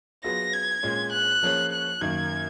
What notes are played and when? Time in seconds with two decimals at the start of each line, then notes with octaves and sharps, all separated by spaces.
0.24 F#3 B3 F4 G#4 B4 A#6
0.53 G#6
0.83 A#2 G#3 C#4
1.13 F#6
1.43 F3 A#3 C#4 G#4 C#5
1.72 F#6
2.01 F#2 D#3 A#3 G#6